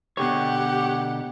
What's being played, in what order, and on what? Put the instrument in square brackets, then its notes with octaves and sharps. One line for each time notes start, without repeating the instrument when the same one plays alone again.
[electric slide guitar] B2 D3 C#5 [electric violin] G4 F#5